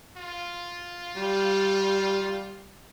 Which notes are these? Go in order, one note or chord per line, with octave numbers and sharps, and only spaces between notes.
F4
G3